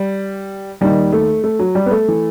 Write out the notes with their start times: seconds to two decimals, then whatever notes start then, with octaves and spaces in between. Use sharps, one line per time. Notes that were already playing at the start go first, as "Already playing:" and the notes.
Already playing: G3
0.81 D#2 D#3 G3
1.13 A3
1.44 A3
1.59 F#3
1.75 G3
1.86 B3
1.91 A3
2.08 E3